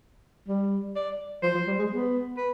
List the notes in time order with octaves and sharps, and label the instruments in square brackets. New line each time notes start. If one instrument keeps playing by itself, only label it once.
[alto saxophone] G3
[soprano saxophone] D5
[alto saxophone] F3 [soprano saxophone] C5
[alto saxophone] F3
G3
G#3
B3
[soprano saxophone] B4